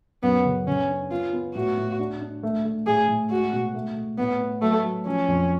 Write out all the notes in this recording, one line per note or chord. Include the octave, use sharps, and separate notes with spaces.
F#2 B3
C#3
C#3 C#4
D4
B3 F4
B3
A2 F#4
A2
D4
D4
A3
A3
A2 G#4
A2
G#3 F#4
B2
A3
A3
A2 B3
B3
F#3 A3
F#3
F3 C#4
F2